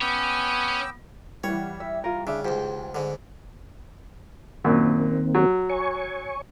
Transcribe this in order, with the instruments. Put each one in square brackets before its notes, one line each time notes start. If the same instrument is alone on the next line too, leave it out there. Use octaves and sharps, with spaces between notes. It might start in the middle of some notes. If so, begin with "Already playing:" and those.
[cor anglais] B3 [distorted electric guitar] C#4 C#5 [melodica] G5 D6 E6
[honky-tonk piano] E3 G3 [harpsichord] C#5 [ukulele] F#5
[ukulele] E5
F4 A#4
[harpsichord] C#3 [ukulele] D4 E5
[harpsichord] C#2 G#2 [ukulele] G4 C5
[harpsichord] G#2 D3
[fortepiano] F#2 A#2 [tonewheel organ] D#3 A#3 C4
[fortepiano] F#3
[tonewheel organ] C#5 G#5 C#6